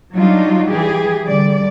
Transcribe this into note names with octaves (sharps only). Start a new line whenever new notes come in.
F#3 G3 D4 D#4 F4
E3 G4 G#4
D3 G3 D5